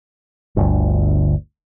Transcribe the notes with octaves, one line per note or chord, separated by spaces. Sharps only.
G1 D2